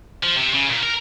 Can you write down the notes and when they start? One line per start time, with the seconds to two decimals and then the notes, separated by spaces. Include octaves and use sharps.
0.23 F3
0.37 C3
0.54 C#3
0.70 A#2
0.83 A#4